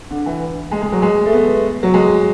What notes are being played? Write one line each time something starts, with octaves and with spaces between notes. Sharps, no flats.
D3
E3
G#3
G#3
F#3
G#3
A3
B3
F#3
G#3